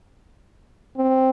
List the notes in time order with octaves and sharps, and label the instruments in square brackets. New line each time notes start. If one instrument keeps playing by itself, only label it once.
[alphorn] C4